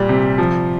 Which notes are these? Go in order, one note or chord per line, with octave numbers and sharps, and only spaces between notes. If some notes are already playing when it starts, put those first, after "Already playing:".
Already playing: A#2 G3
C3
F3